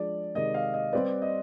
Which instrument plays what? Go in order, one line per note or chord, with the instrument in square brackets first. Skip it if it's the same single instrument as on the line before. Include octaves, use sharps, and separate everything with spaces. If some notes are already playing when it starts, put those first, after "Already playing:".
Already playing: [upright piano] F3 G#3 D4 G#4 [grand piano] D5
[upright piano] C3 D#3 G#3 [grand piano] D#5
[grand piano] F5
D#5
[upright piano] G3 C4 G4 B4 [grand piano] D5
[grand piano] D#5